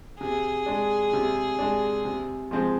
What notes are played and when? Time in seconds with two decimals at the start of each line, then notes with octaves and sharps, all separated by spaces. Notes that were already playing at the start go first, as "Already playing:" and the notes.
0.20 C3 G#4
0.66 G#3 D4
1.13 C3
1.59 G#3 D4
2.05 C3
2.51 F3 G#3 C4